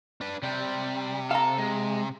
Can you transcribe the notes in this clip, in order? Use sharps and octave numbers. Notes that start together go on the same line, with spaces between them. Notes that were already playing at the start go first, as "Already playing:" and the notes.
D4 B4
C3 G3 G5
A4 F5 A#5
G#3